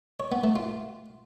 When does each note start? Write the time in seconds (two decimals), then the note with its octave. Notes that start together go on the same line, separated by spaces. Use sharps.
0.20 C#5
0.32 B3
0.44 A3
0.56 F4